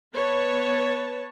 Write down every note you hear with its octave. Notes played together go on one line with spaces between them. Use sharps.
B3 B4 C#5 A5